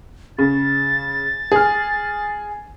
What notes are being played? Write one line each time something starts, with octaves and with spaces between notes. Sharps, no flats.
C#3 A6
G#4 F6